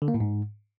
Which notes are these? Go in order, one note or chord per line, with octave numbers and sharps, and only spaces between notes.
D3
A#3
A2
G#2